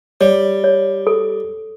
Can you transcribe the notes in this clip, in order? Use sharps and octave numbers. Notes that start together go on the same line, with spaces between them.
G3 C#5
C#5
A4